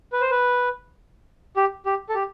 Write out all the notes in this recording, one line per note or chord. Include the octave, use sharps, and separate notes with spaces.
B4
C5
B4
G4
G4
A4
G4